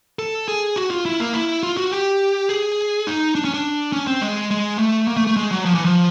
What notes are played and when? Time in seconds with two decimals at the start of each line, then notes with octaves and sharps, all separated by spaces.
0.19 A4
0.48 G#4
0.76 F#4
0.91 F4
1.05 E4
1.20 A#3
1.33 E4
1.63 F4
1.77 F#4
1.92 G4
2.49 G#4
3.07 D#4
3.35 D4
3.45 C#4
3.54 D4
3.93 C#4
4.07 C4
4.21 G#3
4.51 G#3
4.79 A3
5.08 A#3
5.17 A3
5.27 A3
5.37 G#3
5.51 F#3
5.65 F3
5.74 E3
5.85 F3